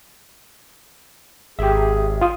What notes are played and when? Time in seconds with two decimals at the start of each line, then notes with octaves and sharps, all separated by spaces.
1.59 G#1 G4 G#4 E5
2.21 F4 D#6